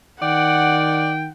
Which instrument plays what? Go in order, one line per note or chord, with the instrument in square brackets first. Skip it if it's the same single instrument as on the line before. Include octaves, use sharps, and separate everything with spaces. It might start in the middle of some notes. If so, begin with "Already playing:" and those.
[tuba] D#3 [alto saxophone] D5 [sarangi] F#5 [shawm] G5